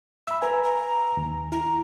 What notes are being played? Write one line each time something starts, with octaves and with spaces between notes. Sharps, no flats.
E5 B5 E6
B4 G#5 A#5
A#5
D#2
E4 A#5